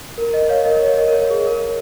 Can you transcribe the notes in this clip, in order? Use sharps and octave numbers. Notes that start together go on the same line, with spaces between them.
A#4
A#4 D#5
C#5 F5
A#4 D#5
C#5
A#4 D#5
A#4
C#5
G#4
A#4